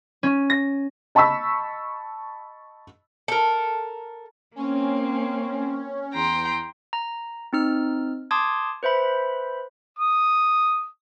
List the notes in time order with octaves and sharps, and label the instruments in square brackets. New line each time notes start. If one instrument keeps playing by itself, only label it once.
[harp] C#4
A#6
[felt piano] D#5 A5 B5 C#6 E6 B6
[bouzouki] A4 A#4
[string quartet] A#3 C4 [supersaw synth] C#4
[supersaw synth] E2 [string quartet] G5 A#5 C6
[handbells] A#5
C4 D#4 F6
A5 C6 D6 D#6 G#6
B4 C5 E5 B5
[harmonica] D#6